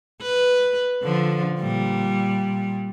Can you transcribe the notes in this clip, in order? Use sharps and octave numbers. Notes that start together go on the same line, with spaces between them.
B4
D3 F3
A#2 G3